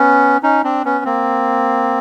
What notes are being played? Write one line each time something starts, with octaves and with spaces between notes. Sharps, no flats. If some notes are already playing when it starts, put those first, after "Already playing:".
Already playing: B3 C#4
C#4 D#4
C4 D4
B3 C#4
A#3 C4